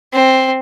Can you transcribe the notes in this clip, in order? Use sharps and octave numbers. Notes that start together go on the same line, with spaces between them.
C4